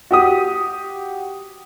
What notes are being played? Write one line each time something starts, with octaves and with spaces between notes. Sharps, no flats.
F#4 G4 D#6